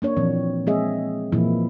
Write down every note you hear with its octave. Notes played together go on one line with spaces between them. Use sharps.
A#3 D4 C#5
A#2 E3 F3 C4
G#3 C4 G#4 D#5 E5
A#2 E3 F3 A#3 E4